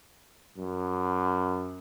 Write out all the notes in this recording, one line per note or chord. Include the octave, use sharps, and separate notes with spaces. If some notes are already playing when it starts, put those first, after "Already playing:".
F#2